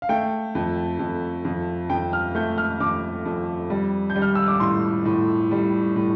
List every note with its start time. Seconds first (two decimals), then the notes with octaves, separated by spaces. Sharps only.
0.02 F5
0.09 A3 G5
0.55 F2
0.99 F2
1.45 F2
1.90 F2 G5
2.13 F6
2.35 A3 G6
2.58 F6
2.80 F2 D6
3.25 F2
3.70 G3
4.10 G6
4.15 G3
4.22 F6
4.35 E6
4.48 D6
4.60 A2 C6
5.05 A2
5.51 G3
5.96 A2